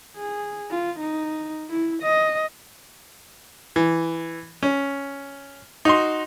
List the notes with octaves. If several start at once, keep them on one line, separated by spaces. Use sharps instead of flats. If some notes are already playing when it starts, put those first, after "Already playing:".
G#4
F4
D#4
E4
D#5
E3
C#4
D#4 F#4 C6